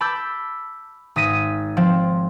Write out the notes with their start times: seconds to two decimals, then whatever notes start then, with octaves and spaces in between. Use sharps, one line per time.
0.01 A5 B5 D6 E6 G6
1.16 G#1 D#6 A#6 B6 D#7
1.77 F3 C4